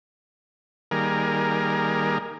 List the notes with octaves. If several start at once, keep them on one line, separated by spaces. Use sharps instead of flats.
D#3 G3 A#3 G#4 A#4